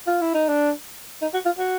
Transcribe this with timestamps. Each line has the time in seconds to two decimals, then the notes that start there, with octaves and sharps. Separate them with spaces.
0.07 F4
0.21 E4
0.35 D#4
0.49 D4
1.22 D#4
1.34 F#4
1.46 F4
1.58 F#4